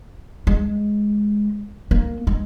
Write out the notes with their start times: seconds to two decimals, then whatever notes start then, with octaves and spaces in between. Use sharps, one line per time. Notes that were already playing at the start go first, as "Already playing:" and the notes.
0.47 G#3
1.91 A#3
2.27 G#3